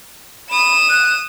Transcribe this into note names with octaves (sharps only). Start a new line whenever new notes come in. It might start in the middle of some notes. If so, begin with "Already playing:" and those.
B5 D#6 E7
F#6